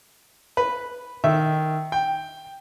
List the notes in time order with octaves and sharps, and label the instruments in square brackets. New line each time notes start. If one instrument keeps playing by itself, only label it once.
[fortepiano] B4
[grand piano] D#3 [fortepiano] E5
[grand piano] G5